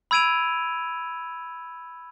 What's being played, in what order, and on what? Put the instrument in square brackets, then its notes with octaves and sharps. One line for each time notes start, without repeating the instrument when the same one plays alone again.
[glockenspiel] B5 E6 G#6 D7 D#7 F7